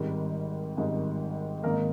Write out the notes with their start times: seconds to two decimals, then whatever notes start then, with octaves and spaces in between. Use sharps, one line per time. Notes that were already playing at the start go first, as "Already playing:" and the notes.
Already playing: G#1 G#2 D#3 G3
0.77 G#1 G#2 D#3 G3
1.63 G#1 G#2 D#3 A#3 A#4